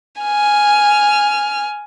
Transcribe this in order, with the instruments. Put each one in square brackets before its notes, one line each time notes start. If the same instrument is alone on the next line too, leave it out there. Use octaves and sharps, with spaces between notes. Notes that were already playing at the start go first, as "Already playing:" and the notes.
[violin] G#5 F6